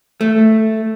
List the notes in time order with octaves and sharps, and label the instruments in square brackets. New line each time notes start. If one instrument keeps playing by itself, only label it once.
[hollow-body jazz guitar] A3